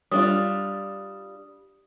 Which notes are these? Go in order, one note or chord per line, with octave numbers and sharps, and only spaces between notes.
G3 D4 F4 D#6